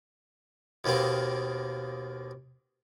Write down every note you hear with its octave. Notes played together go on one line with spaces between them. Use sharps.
D#2 B2 D#3 A#3 C4